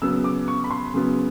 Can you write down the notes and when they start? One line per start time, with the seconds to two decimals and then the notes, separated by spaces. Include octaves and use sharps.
0.02 C#3 F#3 B3 E6
0.24 D6
0.48 C#6
0.64 B5
0.71 C6
0.94 C#3 F#3 B3